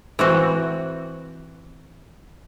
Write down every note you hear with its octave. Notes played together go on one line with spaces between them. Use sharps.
E3 C4 F#4